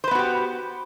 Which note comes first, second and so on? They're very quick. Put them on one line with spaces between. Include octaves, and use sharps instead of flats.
C5 B4 B3 F#4 G4